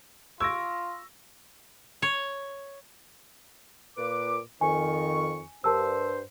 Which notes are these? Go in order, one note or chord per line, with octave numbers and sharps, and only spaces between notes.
F4 C#6 E6 G#6 A#6 D7
C#5
A#2 B4 D6
F2 D#3 G#5 C#6
G2 A#4 C5 A5 E6